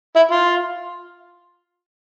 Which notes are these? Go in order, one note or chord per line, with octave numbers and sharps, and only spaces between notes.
E4
F4